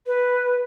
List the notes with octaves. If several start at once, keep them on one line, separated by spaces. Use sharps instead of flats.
B4